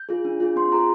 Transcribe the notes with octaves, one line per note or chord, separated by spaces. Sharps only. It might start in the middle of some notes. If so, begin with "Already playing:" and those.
Already playing: G6
F4 G#4
D4
F4 G#4
C4 C6
F4 G#4 A#5